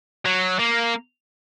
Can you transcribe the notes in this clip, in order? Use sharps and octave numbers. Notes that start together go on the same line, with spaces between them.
F#3
A#3